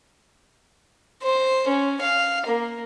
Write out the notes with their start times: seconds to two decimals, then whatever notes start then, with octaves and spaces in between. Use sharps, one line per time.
1.23 C5
1.68 C#4
2.02 F5
2.47 A#3